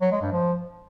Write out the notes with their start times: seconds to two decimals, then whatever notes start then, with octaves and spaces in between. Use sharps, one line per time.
0.01 F#3
0.11 G#3
0.22 G2
0.32 F3